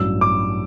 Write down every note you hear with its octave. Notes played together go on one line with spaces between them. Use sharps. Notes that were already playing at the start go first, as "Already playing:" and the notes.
Already playing: A1 G2 F#3 E6
D6